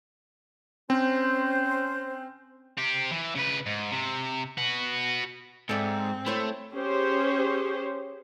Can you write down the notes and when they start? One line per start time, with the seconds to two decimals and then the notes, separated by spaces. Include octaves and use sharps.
0.90 C4 C#4 C5
2.78 C4 G4
3.11 E3
3.35 C#3 B4
3.66 G#2
3.91 C3
4.58 F#4 B4
5.69 G#2 C4 A4 D5 E5
6.26 A3 E4 C5 C#5
6.73 C#4 G4 G#4 C5 C#5